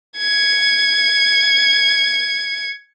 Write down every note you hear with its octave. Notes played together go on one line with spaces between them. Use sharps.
G#6 C#7